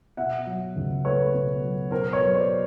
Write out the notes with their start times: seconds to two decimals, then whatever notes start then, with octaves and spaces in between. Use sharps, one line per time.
0.17 B2 E5 F#5
0.46 F#3
0.76 C#2
1.04 A3 B4 C#5
1.34 B2
1.63 F#3
1.91 B2 A#4 C5
2.13 B4 C#5
2.20 F#3
2.34 C5 D5